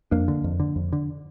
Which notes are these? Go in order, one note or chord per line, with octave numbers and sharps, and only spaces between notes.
F2 A#3 D4
D3
F2
D3
F2
D3